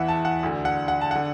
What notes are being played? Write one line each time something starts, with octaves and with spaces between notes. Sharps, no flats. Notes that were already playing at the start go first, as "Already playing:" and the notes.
Already playing: E2 E3 E5 F#5
A5
F#5
D2 D3
F#5
F#5
A5
D3 F#5